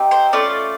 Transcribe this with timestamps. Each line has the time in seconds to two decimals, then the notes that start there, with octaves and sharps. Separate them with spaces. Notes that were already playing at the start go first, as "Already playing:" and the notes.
Already playing: C4 D#4 G4
0.11 C5
0.33 A3 C#4 F4 D5